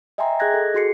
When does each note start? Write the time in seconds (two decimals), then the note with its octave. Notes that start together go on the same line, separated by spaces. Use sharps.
0.18 D#5 E5 G5 G#5 A#5 C6
0.39 G#4 D#5 F#6 G#6 A#6
0.54 A4
0.74 F#4 G#4 C6 C7 C#7